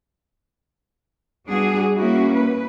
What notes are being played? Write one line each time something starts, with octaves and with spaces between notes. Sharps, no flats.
G3 B3 D4 F#4 G#4
A#3 C#4 E4 F#4
B4